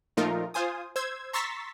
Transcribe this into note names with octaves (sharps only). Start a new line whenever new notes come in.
A#2 F3 A3 D#4 F4 A#4
F4 C5 G#5 D#6
C5 E6 G#6
A#5 C6 C#6 E6 A6 B6